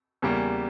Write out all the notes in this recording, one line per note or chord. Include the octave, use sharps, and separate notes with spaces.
E2 C#3 G3 A#3